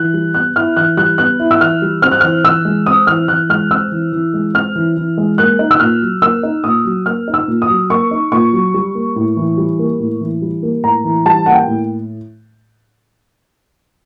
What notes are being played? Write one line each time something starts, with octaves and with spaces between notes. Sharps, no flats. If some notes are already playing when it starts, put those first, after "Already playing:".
Already playing: E3 F#6
G3
B3 F#6
E4 F6
E3 F#6
G3 F#6
B3 F#6
E4
E6
E3 F6
G3
C4 F6
F#6
E3 F6
E3 E6
G#3
C4 D#6
E3 F6
E3 F#6
G#3 F6
C4 E6
E3
E3
G#3
C4 F6
E3
E3
G#3
A#3 F#6
D#4
E6
A#2 F6
F#3
A#3 E6
D#4
A#2 D#6
F#3
A#3 F6
D#4
E6
A#2
D#6
F#3
A#3 C#6
D#4
A#2 C#6
F#3
G3
A#3
A2
E3
G3
A#3
A2
E3
G3
A#3
A2 A#5
E3
G3 A5
A#3 F#5
G5
A2